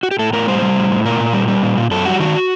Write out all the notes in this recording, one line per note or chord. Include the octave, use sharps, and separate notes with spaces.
F#4
G4
A2 A4
A2 A#4
G3 C5
G3
A2
A2
A#2 A#4
A#2
G3
G3
A#2
A#2
F#2 A4
G3 F#4
D#3 F#4